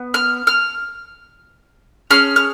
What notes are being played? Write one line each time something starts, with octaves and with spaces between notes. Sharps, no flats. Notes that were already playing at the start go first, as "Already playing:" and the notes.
Already playing: B3
F6
F6
C#4 G#4 F6
F6